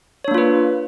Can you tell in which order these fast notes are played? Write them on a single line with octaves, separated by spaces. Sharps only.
C#5 D4 A#3 F4 B4